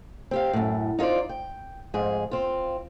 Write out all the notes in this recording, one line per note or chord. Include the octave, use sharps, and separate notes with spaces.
C4 G4 F5
F#2 A2
D#4 F4 G#4 C5 D5
G5
F2 G#2 G#4
C4 F4